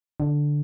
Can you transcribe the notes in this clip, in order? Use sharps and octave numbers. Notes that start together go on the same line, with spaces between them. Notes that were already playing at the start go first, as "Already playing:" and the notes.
D3